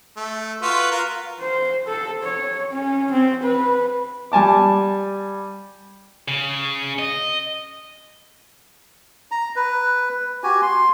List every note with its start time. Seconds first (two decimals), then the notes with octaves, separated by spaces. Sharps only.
0.17 A3
0.62 F4 F#4 B4
0.91 F4 A#4
1.40 C5
1.87 A4
2.23 C#5
2.71 C#4
3.11 C4
3.44 B4
4.32 G3 G#5 A5 D6
6.28 C#3
6.99 D#5
9.31 A#5
9.56 B4
10.43 F#4 G4 G#5
10.62 C6